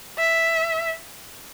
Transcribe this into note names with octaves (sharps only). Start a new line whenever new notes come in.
E5